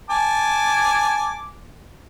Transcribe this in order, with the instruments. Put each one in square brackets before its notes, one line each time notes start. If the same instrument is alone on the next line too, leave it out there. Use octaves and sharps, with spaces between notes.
[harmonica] G#5 A5 D6